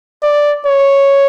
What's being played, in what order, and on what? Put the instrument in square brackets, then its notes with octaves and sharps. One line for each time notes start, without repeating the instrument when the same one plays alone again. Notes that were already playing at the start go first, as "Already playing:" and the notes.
[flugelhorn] D5
C#5